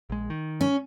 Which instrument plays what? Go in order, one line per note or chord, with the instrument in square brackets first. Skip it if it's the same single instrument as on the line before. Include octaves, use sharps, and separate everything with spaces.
[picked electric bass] A#1 G#3
D#3
[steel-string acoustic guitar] C#4